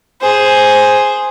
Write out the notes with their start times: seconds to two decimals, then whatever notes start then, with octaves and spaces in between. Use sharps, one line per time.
0.21 G#4 C5